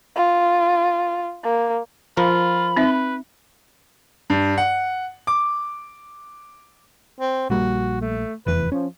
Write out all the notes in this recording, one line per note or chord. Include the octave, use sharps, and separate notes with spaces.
F4
A#3
F3 F4 A#4 B5
C4 D#4 B4 E5
G2
F#5
D6
C4
A#1 G3 A#3 F#4
A3
F1 E2 E3 B4
F3 C#4